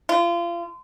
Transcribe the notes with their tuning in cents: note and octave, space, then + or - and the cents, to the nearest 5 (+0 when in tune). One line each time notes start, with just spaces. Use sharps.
F4 -30